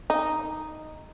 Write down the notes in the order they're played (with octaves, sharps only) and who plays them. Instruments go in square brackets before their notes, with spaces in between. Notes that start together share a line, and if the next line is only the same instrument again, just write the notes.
[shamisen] D#4